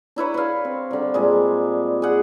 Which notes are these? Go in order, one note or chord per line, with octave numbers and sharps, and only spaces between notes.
D4 E4 B4 C#5
B4 C#5 F5
C4
D3 G3
A#2 G3 G#3
G#4 F#5